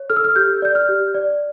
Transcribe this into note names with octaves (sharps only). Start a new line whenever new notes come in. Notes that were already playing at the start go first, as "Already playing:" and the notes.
Already playing: C#5
A4 F6
E6
F6
G4 G6
D5 G6
F6
G4
D5